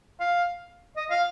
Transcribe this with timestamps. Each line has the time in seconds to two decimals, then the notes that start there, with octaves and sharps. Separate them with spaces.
0.20 F5
0.97 D#5
1.10 F5